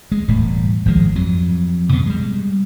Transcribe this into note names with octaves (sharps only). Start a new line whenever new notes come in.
G#3
E1 A2 G3
G#1 F3 G#3
F2 F#3
B2 B3
G3 G#3